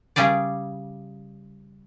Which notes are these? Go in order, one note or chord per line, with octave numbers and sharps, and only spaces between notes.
C#3 G3 G#4 D5